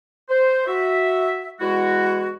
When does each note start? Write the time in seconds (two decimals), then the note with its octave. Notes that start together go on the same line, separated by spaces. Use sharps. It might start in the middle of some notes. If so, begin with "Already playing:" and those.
0.29 C5
0.67 F#4 E5
1.60 E2 G#3 E4 F#4